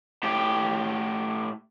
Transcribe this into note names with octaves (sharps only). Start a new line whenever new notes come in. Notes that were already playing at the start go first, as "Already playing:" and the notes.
A2 G4